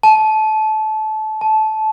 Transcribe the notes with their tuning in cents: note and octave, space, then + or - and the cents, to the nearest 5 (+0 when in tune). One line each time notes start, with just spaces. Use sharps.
A5 -25
A5 -20